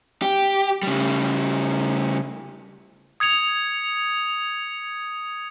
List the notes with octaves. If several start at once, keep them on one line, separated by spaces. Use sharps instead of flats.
G4
C#3 G3
D#6 G#6 C#7 F7